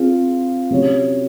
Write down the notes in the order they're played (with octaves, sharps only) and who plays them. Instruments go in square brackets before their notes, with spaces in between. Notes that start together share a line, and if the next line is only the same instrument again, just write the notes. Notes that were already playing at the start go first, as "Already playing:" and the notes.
Already playing: [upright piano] C4 F4 G#4
C3 F#3 C#4 F#4 C#5